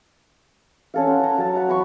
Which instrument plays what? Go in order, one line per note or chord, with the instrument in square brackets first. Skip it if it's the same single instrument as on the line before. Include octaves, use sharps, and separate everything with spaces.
[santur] C#4 A4 F5
F#5 C6
A5 A#5
F#3 A5
F#5 A#5 B5 C#6
A5 B5 C#6